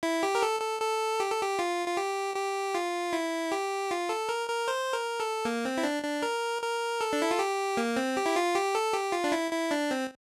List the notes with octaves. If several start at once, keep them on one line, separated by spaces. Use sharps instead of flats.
E4
G4
A#4
A4
A4
A4
G4
A4
G4
F4
F4
G4
G4
F4
E4
G4
F4
A4
A#4
A#4
C5
A#4
A4
A#3
C4
E4
D4
D4
A#4
A#4
A4
D4
E4
F4
G4
A#3
C4
G4
E4
F4
G4
A4
G4
F4
D4
E4
E4
D4
C4